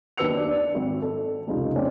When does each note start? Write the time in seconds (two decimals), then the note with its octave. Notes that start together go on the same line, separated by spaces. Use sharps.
0.17 D#2 D4 B4 E6 C#7 F7
0.34 D4 D5
0.74 G#1
1.02 A4
1.47 F1 C#2 D#4 F4
1.76 A3 C4 C#4 D5